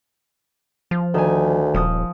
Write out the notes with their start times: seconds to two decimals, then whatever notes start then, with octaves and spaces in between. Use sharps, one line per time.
0.91 F3 F4
1.14 D2 D#3 G#5
1.74 D#1 F3 D#6